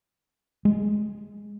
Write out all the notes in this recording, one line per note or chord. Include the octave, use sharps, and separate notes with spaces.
G#3